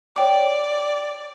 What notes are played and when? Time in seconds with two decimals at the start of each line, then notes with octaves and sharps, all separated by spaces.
0.16 C#5 D5 G5 D6